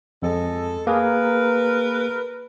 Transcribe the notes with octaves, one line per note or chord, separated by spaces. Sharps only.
F2 G#3 A4
A#3 G#4 A#4 B4